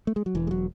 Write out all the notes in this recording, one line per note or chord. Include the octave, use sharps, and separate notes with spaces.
A3
G#3
F#3
E1 E3
G#3
F#3